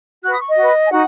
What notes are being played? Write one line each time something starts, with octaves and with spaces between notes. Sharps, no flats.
F#4 B4 F#6
D#6
C#6
D#5
F#4
B4
G#5
D#4 F#4 F#5